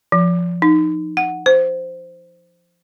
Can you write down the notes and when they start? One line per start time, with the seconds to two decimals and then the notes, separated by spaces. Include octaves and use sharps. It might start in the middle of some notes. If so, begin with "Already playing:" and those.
0.12 F3
0.62 D#4
1.17 F#5
1.46 C5